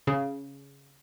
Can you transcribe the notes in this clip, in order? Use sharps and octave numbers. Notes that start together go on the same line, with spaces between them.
C#3